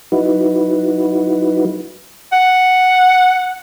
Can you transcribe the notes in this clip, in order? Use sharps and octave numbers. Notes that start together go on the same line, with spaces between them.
F#3 D#4 E4 F#4 B4
F#5